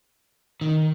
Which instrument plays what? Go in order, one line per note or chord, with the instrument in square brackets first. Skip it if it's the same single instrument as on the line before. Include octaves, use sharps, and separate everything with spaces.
[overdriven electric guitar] D#3